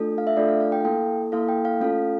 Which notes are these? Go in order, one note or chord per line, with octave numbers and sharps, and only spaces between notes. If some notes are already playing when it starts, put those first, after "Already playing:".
Already playing: A3 D4 F4 A4
F5
E5
A3 D4 F4 A4 D5
F5
F5
G5
F5
A#3 E4 A4 G5
A#3 E4 A4 F5
G5
F5
A3 C#4 F4 A4 F5